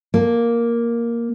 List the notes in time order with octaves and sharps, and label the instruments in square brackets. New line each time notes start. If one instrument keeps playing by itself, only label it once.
[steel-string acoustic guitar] A#3